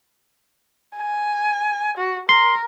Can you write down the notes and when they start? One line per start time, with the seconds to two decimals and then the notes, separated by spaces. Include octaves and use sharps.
0.97 G#5
1.97 F#4
2.29 A#4 C6